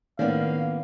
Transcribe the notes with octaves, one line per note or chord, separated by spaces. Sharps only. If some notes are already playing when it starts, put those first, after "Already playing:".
A2 D#3 A#3 B3 C#4 D5 F5